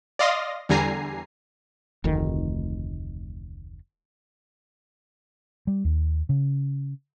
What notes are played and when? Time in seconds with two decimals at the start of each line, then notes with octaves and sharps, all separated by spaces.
0.19 D5 D#5 F5 C6 D#6 A#6
0.69 E2 D3 G3 G#5 A#5 C7
2.04 F1 D2 D#3
5.67 G3
5.84 D#2
6.29 C#3